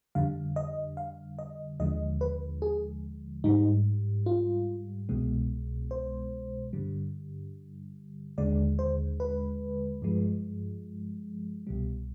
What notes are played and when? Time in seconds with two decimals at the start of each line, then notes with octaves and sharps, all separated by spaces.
0.15 F2 D3 G3 F5
0.56 D#5
0.97 F5
1.39 D#5
1.80 D#2 D3 F3 G#3 D#5
2.21 B4
2.62 G#4
3.44 G#2 G3 D#4
4.26 F4
5.09 C2 B2 G#3
5.91 C5
6.73 G2 D3 G3
8.38 D#2 D3 G#3 D5
8.79 C5
9.20 B4
10.02 G2 F3 G#3
11.67 C2 B2 G3